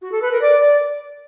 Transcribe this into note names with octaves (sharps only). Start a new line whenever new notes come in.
F#4
A4
B4
A#4
D5